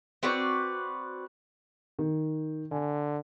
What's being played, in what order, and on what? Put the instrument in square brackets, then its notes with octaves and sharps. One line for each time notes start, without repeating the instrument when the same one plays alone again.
[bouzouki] C4 F#4 B4 D5
[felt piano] D#3
[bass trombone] D3 [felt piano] G#5